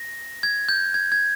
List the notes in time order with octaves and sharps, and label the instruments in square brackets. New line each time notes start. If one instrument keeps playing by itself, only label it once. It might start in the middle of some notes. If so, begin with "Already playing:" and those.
Already playing: [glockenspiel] A#6
G#6
G6
G#6
G#6